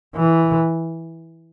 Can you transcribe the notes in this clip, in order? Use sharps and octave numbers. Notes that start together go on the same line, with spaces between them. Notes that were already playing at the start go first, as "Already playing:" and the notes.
E3